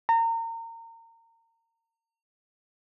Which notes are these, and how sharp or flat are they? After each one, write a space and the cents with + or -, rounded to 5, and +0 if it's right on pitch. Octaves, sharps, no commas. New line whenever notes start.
A#5 -30